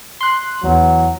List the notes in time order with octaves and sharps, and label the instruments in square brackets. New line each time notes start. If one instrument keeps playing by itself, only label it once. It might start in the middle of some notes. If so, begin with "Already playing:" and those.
[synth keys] C6 F#6
[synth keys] E2 [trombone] F#3